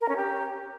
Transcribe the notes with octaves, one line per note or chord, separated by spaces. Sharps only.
A#4
C#4
G4